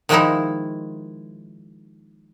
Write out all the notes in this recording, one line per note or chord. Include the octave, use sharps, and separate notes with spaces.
D#3 F3 G#3 A#3 D#4 E4